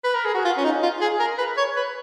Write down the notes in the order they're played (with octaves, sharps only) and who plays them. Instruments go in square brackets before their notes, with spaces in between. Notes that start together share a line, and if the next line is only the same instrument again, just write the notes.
[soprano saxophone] B4
A#4
G#4
F#4
F4
C#4
D#4
F4
G#4
A#4
B4
C#5
B4